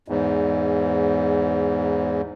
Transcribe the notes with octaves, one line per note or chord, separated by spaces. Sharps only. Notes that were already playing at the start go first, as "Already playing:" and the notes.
E2 G#2